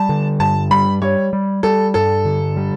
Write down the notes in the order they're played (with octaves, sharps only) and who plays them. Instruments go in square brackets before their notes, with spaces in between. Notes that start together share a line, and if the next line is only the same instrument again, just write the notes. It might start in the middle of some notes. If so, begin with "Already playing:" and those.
Already playing: [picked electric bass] G3 [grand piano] A5
[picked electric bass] D3
[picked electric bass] G2 [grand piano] A5
[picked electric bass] G3 [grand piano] B5
[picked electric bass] G3 [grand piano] C#5
[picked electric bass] G3
[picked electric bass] G3 [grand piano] A4
[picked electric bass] G2 [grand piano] A4
[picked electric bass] D3
G3